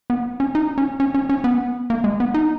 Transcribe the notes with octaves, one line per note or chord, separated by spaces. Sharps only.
B3
C#4
D#4
C#4
C#4
C#4
C#4
B3
A#3
G#3
B3
D#4